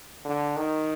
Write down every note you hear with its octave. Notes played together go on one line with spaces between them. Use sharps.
D3
D#3